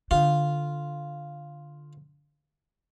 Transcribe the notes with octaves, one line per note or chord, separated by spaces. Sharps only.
D3 F4